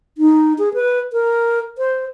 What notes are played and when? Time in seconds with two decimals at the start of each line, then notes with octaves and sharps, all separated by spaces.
0.18 D#4
0.58 G#4
0.74 B4
1.13 A#4
1.78 C5